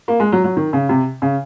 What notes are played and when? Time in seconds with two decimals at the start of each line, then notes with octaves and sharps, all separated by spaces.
0.08 A#3
0.20 G#3
0.32 F#3
0.44 F#3
0.57 D#3
0.73 C#3
0.89 C3
1.22 C#3